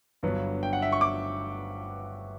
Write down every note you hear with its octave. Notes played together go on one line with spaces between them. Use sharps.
G1 G2 D3 F#3 B3
G5
F#5
E5
C#6
D6